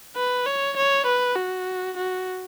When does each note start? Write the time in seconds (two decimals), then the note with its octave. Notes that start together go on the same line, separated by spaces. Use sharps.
0.16 B4
0.46 C#5
0.77 C#5
1.06 B4
1.36 F#4
1.97 F#4